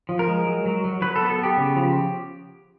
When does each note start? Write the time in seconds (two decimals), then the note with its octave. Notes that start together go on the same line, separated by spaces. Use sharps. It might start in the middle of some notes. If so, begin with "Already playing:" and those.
0.09 F3
0.19 A#4
0.28 G#3
0.46 F#3
0.66 F#3
0.84 F#3
1.02 F#3 B4
1.16 A4
1.21 B3
1.30 A4
1.39 B3 G4
1.57 C#3
1.76 F3